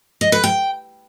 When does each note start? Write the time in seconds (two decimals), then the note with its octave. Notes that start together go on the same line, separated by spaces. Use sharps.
0.21 D#5
0.32 B4
0.44 G5